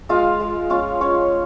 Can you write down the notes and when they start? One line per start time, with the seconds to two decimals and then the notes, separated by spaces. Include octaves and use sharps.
0.09 G#3 F4 F5
0.40 G#3
0.70 C#4 F4 F5
1.01 C#4 F4 C#5